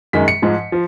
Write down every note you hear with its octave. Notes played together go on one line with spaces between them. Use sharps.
F#2 D#3 G#3 B6
C#7
G#2 F3 G#3
F3